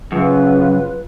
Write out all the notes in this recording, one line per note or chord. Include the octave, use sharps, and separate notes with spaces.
F#2 C#3 F4 B4